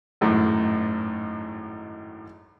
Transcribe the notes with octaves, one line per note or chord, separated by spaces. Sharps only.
G#1 F#2 A2